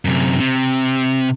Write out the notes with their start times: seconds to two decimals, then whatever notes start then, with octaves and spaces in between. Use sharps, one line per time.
0.05 F#2 C3
0.40 C3